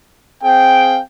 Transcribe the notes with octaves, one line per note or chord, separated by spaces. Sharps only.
C4 G#4 F5 G5